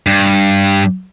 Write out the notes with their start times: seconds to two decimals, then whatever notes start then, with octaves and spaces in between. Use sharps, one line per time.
0.07 G2